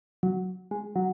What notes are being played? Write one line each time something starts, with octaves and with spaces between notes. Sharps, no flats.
F#3
G#3
F#3